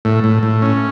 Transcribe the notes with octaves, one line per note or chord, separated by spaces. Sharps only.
A2
A2
A2
C#4